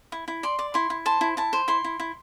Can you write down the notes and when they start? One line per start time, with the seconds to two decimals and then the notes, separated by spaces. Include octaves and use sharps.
0.12 E4
0.28 E4
0.43 D5 C6
0.59 D5
0.74 E4 C6
0.90 E4
1.06 C5 A5
1.21 E4
1.37 E4 A5
1.53 C5
1.68 E4 C6
1.84 E4
2.00 E4